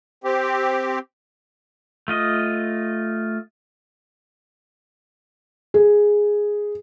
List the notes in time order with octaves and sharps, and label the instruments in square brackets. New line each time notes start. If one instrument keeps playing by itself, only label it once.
[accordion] C4 G4
[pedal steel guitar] A3 F4 D#5
[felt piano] G#4